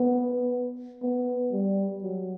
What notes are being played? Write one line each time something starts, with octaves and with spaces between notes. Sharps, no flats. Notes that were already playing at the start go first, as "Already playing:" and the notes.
Already playing: B3
B3
G3
F#3